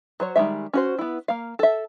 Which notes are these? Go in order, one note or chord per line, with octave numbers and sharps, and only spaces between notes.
F#3 C5 C#5
D#3 G3 G#3 E5
C#4 F#4 C5
B3 E4
A#3 F5
A4 E5